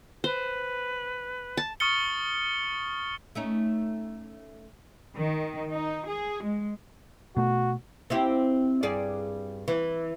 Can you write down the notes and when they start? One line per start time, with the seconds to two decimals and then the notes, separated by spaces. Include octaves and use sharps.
0.24 B4 C5
1.57 A5
1.80 C#6 D#6 F6 A6 C#7 G7
3.35 A3 C#4 D#4
5.16 D#3
5.71 D#4
6.08 G#4
6.44 G#3
7.37 B2 A3 F#4
8.10 C4 E4 G4
8.83 G2 G#4 D5
9.68 E3